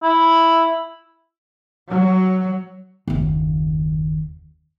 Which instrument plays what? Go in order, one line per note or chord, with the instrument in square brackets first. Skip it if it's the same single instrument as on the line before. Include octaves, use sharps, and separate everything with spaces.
[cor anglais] E4
[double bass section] F#3
[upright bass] F#1 D#2